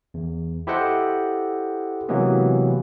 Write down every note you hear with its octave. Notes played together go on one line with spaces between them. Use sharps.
E2
E4 G4 A4 C5 D#5 F#5
C3 E3 F#3 G#3 A#3 B3